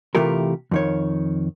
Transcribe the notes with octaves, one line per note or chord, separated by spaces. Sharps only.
C3 E3 A3 F4 G4 A#4
F2 D#3 C#5